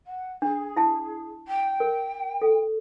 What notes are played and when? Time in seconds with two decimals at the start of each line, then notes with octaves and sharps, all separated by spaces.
0.06 F#5
0.42 D4 G#4
0.77 E4 A5
1.47 G5
1.80 A#4
2.42 A4